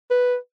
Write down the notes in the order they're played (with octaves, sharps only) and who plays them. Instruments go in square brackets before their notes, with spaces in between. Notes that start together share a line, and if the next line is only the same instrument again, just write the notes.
[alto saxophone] B4